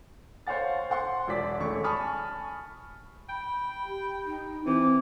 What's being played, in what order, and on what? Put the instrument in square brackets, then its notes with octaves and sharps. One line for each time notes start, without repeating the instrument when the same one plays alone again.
[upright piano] C5 C#5 F5 F#5 A6
C5 F#5 C6
E1 F#4 D5 D6 B6
E1 A1 A4 C#6
G#5 A5 B5 C#6 D#6 F6
[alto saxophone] G5 [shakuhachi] B5
[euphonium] G4
[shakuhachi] D#4
[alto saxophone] E3 [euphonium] C4 [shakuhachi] D6